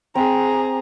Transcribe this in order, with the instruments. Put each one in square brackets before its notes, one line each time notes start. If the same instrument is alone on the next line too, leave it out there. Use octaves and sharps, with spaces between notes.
[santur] C4 [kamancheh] G#4 A#5